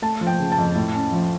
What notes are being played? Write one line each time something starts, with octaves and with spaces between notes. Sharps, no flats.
A3 A5
F3
G5
C#3
A5
F2
A2
C#4
F3